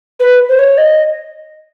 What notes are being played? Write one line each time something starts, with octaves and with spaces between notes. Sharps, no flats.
B4
C5
C#5
D#5